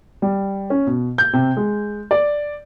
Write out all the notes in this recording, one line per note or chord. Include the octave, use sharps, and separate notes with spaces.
G3
C#4
B2
G6
C3
G#3
D5